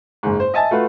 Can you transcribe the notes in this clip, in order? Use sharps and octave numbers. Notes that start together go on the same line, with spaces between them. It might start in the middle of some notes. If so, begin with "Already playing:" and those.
F#1 G#2
C5
D#5 E5 G#5 A5 A6
A3 F4 F#4 B4